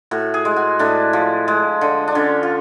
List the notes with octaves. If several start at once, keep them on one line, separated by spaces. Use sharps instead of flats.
A2 F#4
G#4
G#3
F#4
A2 D4
F3
G#3
D3
D4
D3 C#4
F4